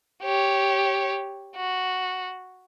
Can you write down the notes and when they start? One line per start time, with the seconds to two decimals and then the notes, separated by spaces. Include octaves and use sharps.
0.23 G4 C#5
1.56 F#4